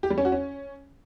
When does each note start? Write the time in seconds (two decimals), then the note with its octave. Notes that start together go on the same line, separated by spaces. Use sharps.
0.03 G4
0.10 G3
0.18 C#4
0.25 F#4
0.32 C#4